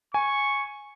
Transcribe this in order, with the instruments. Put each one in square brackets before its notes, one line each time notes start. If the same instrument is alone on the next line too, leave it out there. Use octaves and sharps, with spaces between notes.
[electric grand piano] G#5 [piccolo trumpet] C#6